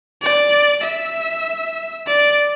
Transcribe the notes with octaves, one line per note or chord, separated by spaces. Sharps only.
D5
E5
D5